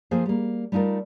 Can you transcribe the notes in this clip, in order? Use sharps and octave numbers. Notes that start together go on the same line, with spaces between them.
F3 A#3 F4 G#4 A4 C5
G3 A#3
G3 A3 D#4 F4 A#4